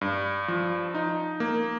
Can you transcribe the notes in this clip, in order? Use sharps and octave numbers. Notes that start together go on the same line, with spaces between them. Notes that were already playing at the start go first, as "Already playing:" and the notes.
G2
F3
D#4
A#3